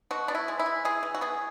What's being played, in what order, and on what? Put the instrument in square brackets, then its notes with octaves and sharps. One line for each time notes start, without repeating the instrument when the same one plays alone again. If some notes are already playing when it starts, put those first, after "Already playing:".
[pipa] B2 F#4
B3 D4
E4
G#3
E4
G#3
E3 G#4
E3
F#4
B3 G#4